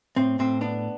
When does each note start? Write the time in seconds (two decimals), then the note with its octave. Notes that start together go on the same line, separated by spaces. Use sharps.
0.16 A2 C4
0.39 A2 C4
0.61 B3 D4